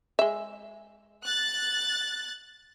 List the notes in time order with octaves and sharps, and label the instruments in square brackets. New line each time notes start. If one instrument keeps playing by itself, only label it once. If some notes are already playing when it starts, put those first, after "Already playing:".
[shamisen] G#3 E5
[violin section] F#6 A6